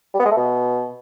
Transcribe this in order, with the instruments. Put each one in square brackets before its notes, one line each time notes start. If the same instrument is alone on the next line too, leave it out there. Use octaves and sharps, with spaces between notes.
[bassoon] G3
B3
G#3
A3
B2